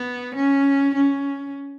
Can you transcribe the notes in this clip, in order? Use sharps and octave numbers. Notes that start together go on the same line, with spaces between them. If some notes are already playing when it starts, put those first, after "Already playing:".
Already playing: B3
C#4
C#4